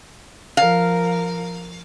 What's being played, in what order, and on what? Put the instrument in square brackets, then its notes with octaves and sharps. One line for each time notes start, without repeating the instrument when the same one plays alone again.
[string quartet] F3 A#4 [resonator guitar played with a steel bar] F5